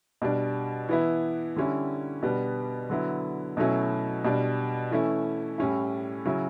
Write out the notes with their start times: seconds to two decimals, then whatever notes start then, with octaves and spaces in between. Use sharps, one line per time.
0.22 B2 G3 D4
0.89 E3 B3 E4
1.56 D3 G3 C#4 E4
2.22 B2 G3 B3 D4
2.90 D3 F#3 B3 E4
3.57 B2 F#3 A3 C#4 E4
4.24 B2 G3 D4
4.91 E3 A3 C#4 E4
5.58 A2 G3 C#4 E4
6.25 C#3 F#3 C#4 E4